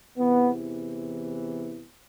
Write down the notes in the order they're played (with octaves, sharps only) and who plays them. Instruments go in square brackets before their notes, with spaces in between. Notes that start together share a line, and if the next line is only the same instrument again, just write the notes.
[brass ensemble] E2 C3 E3 B3